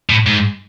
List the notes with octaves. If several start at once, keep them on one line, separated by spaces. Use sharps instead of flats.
A2
G#2